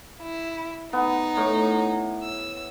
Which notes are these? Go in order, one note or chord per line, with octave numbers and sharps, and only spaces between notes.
E4
B3 D#4
A2
E6